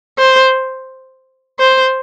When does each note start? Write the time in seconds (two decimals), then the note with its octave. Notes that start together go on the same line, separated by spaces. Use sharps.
0.19 C5
1.59 C5